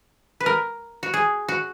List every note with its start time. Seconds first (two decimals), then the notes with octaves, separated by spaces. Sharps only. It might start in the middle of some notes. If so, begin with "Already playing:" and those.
0.40 B4
0.46 A#4
1.03 F#4
1.14 G#4
1.48 F#4